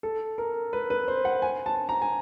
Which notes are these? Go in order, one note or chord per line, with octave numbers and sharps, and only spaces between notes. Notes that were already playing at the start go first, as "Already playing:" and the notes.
A4
A#4
B4
B4
C5
F#5
G#5
A5
A#5
G#5